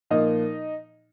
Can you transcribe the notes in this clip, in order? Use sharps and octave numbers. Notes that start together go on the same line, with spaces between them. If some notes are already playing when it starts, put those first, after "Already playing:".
A#2 F3 A#3 D#4 D#5